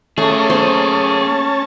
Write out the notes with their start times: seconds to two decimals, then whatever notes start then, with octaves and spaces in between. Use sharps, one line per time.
0.18 A3 A#3 C#4 G#4 A5
0.50 C5